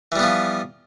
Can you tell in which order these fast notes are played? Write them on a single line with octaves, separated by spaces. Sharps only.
E3 G3 B3 F3